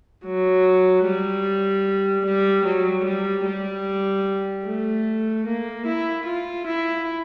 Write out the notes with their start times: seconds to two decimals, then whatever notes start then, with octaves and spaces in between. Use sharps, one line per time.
0.25 F#3
1.06 G3
2.26 G3
2.66 F#3
3.05 G3
3.46 G3
4.66 A3
5.47 A#3
5.87 E4
6.26 F4
6.67 E4